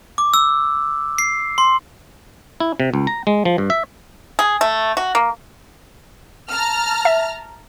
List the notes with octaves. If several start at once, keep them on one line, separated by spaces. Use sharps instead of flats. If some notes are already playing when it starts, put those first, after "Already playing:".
D6
E6
C7
C6
E4
C3
C#2
A#5
G#3
F3
G2
E5
G#4
A3
F#4
A#3
A5 A#5 F6
E5